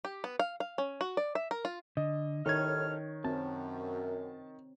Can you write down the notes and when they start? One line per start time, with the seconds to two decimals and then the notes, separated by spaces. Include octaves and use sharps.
0.05 G4
0.24 B3
0.39 F5
0.60 F5
0.78 C#4
1.01 F#4
1.17 D5
1.35 E5
1.51 A#4
1.65 F4
1.97 D3 D#5
2.46 C2 A2 D#3 D#4 A4 C#5 F6 G#6
3.24 F#2 C4 A5